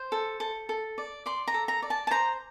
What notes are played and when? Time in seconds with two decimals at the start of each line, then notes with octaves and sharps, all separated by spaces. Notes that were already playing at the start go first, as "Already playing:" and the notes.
Already playing: C5
0.12 A4
0.40 A4
0.69 A4
0.98 D5
1.26 D5 C6
1.48 A#5
1.54 A4
1.68 A#5
1.82 D5
1.90 A5
2.07 A5
2.11 C5 A#5